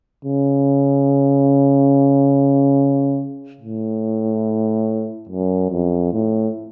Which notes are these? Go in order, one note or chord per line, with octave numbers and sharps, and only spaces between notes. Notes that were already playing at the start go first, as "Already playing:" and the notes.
C#3
A2
F#2
F2
A2